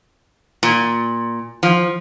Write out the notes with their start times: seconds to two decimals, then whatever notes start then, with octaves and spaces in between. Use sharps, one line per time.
0.63 A#2
1.63 F3